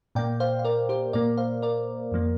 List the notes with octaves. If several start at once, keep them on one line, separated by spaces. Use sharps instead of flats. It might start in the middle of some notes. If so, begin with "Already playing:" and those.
A#2 A#3 D5 G5
C5 F5
F5
A#4 D5
G4 C5
A#2 A#3 A#4 D5
C5 F5
A#4 D5
F2 F3 A#3